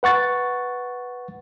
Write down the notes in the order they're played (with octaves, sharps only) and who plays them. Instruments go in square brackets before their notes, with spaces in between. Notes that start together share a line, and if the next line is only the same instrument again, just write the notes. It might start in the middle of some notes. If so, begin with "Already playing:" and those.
[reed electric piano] B4 F#5 C#6 A6